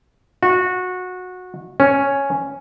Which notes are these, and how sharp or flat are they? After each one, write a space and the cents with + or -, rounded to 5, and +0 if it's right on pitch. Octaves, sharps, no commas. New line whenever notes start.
F#4 -20
C#4 +0